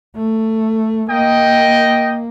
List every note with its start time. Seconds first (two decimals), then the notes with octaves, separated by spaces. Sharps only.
0.16 A3
1.10 A#3 D#5 G5